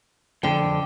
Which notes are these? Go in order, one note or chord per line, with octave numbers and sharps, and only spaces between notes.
F2 D3 G5